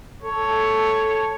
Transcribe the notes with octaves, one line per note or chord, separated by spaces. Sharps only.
A4 C#5